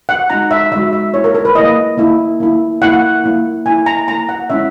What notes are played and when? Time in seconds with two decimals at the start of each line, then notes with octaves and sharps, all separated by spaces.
0.09 F#5
0.29 G#3 D#4 F#4 A#5
0.51 E5
0.72 G#3 D#4 F#4 E5
0.93 E5
1.13 A#3 E4 C#5
1.24 A#4
1.35 A#4
1.45 B4
1.55 A#3 E4 D#5
1.98 A#3 E4
2.40 A#3 E4
2.82 A#3 E4 F#5
3.24 A#3 E4
3.66 A#3 E4 G#5
3.86 A#5
4.08 A#3 E4 A#5
4.29 F#5
4.50 G#3 C#4 E4 E5